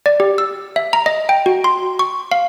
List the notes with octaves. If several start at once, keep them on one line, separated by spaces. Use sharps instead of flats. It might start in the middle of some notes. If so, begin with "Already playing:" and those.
D5
G4
E6
E5
A#5
D#5
G5
F#4
C6
C#6
F5